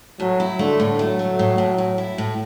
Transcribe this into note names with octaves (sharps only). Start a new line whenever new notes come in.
A2 F#3
E4
D3 A3
A2
F#3 A3
A3
A2
A2
A2
E4
A2